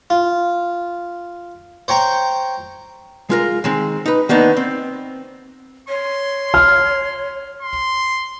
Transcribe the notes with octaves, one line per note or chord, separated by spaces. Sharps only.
F4
C5 C#5 G5 A#5
G#3 F4 A#4
D#3 G#3 C4
D#4 B4
D#3 A#3 B3 D4 D#4
C4
C#5 C6
F6
C6